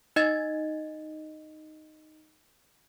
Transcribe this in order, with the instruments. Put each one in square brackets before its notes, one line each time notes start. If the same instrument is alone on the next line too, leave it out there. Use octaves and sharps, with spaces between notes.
[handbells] D#4 D#5 G#6 A6